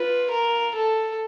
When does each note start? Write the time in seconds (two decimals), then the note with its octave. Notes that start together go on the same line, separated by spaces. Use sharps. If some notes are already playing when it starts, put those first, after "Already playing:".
Already playing: F4 B4
0.31 A#4
0.76 A4